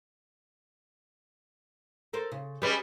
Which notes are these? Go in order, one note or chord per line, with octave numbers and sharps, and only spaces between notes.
A4 A#4 C5
C#3
G3 G#3 C#4 G4 B4 D#5